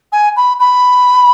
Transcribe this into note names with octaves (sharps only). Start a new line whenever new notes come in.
G#5
B5
B5